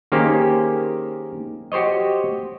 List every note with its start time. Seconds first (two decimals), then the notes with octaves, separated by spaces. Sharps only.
0.12 D#3 A#3 C#4 G4 G#4 C5
1.72 F#4 G4 C5 C#5 D#5